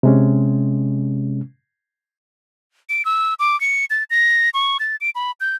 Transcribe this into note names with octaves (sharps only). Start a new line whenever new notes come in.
C3 G#3 C#4
D7
E6
D6
C#7
A6
A#6
C#6
A6
D7
B5
G6